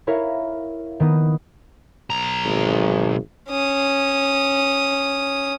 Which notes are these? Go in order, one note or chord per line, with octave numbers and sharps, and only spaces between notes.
E4 A#4 C#5 E5 F5
D#3 B3 D#6
B1 A#5
G#1
C#4 D#6